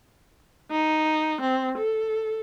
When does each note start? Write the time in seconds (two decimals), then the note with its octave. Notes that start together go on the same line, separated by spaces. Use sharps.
0.71 D#4
1.41 C4
1.78 A4